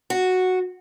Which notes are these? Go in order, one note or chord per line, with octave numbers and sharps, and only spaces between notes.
F#4